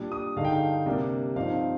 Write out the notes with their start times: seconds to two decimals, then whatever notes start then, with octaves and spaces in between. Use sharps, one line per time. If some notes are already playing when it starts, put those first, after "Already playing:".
Already playing: A#2 G3 D4
0.12 D#6
0.36 G2 D3 G#3 D#4 F5
0.45 G5
0.53 F5
0.86 C3 G3 A#3 D4
1.36 G2 F3 C4 D#4 F5